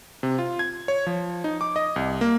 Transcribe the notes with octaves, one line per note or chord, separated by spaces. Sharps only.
C3
F4
G#6
C#5
F3
D#4
D6
D#5
C2
A#3